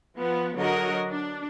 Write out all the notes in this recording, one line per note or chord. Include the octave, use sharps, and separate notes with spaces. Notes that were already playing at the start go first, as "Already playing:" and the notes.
F3 B3
D3 F#3 F#4 A#4 C#5 D#5
D4